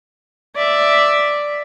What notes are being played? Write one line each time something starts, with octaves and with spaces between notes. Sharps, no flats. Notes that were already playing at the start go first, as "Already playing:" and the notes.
D5 E5